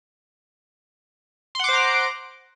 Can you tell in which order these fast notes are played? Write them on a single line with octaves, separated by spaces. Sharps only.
C6 F#5 D6 C5 A#5